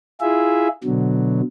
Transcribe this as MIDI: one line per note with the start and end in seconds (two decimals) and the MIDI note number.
0.21 0.68 64
0.21 0.68 65
0.21 0.68 68
0.21 0.68 76
0.84 1.41 47
0.84 1.41 50
0.84 1.41 54